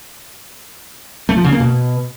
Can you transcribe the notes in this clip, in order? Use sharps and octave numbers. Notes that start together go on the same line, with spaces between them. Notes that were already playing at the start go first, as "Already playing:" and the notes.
A3
F3
C#3
A#3
B2